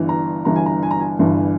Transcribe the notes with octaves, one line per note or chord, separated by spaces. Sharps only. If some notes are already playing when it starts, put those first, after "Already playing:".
Already playing: G1 G2 E3
A#5
G1 G2 E3 A#5
G#5
A#5
G#5
A#5
G#5
G1 G2 E3